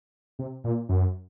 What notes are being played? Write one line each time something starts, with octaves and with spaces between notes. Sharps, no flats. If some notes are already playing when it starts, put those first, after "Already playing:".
C3
A#2
F#2